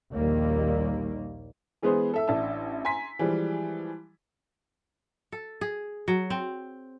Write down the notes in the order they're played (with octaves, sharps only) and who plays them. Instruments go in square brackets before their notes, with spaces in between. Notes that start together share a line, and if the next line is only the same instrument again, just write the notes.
[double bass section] A#1 D#2 D#3 G3 A#3
[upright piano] E3 G#3 B3 G#4 B4 C5
A4 E5 E6
A1 D4 E5 A5
G#5 A#5 C6 B6
E3 F3 G3 G#3
[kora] A4
G#4
F#3
C4